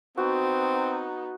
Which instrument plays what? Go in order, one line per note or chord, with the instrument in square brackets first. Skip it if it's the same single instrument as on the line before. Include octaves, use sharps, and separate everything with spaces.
[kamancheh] B3 D#4 [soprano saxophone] C4 [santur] F#4